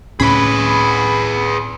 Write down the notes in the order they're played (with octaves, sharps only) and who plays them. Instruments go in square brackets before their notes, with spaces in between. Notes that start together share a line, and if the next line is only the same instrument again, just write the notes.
[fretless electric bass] C#2 A2 C#4 [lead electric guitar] G#4 B4 [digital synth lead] B5